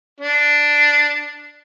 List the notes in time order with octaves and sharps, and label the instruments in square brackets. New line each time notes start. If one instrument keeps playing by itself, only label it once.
[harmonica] D4